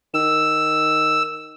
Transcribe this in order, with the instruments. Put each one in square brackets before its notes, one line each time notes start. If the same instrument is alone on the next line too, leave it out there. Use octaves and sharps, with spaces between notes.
[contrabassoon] D#3 [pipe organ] E6